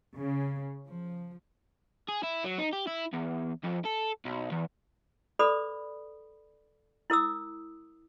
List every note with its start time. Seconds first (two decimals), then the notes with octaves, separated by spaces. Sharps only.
0.16 C#3
0.88 F3
2.09 G#4
2.23 E4
2.45 F#3
2.58 D#4
2.73 G4
2.87 E4
3.13 E2
3.64 F2
3.85 A4
4.25 B1
4.52 E2
5.39 A4 B4 D5 B5 D#6
7.10 E4 A#4 D#6 E6